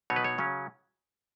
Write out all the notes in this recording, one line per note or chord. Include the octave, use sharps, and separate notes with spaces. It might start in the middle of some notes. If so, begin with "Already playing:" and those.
B2 F#3 B3 D#4 C#5
B4
C#5
C#3 F#3 C#4